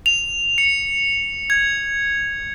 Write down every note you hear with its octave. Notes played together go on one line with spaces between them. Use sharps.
F7
C#7
G#6